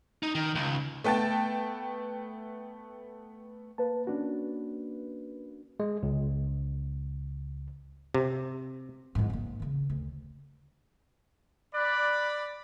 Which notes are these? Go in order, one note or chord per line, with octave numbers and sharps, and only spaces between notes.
D#4
D#3
C#2
A3 B3 G5 A5 A6
A#3 B4 A5
C#4 D4 F#4
G#3
C#2
C3
E2 G#2
A#3 C4
C#3 E3
D2
D5 B5 F#6